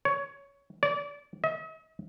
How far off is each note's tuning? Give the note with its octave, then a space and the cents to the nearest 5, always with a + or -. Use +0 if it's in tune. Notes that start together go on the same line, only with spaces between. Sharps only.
C#5 +15
D5 -30
D#5 +45